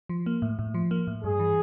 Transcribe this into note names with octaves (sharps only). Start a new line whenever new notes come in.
F3
A#3
A2
A2
F3
A#3
A2
G2 G#4
E3